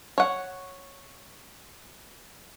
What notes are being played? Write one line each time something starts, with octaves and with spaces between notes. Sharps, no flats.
C#5 F#5